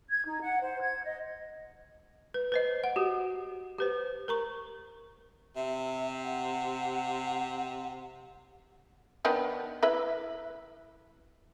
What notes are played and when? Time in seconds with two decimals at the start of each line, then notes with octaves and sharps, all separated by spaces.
0.09 G#6
0.26 D#4
0.41 F#5
0.61 C5
0.81 G#6
1.03 D#5
2.34 B4
2.52 B4 C5 D#5
2.84 F#5
2.96 F#4 G4
3.78 G4 B4 C5
4.28 A#4 A#5 C#6
5.56 C3 E5
6.24 F#5
9.25 D#3 B3 D4
9.83 E4 B4 E5